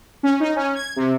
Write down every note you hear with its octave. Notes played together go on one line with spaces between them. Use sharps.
C#4
D#4
C#4
G#6
C3